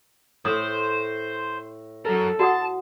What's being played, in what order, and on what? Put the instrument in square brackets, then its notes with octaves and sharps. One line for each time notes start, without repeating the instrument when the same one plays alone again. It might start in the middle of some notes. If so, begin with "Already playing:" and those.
[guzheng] A2 [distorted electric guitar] C5 [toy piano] D#6
[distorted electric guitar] F#3 A#4 [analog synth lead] A4
[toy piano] F#4 F#5 D#6 [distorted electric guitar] A5